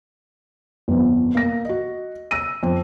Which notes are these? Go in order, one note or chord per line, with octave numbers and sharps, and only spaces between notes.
G1 F2
A#3 A#6
F#4 D#5
E6 A#6 D#7
F2